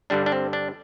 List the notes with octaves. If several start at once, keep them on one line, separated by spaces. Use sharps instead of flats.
G2 D3 G3 D4
D4
C4
D4